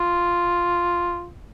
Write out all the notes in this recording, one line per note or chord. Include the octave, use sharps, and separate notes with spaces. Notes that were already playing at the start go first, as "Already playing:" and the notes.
Already playing: F4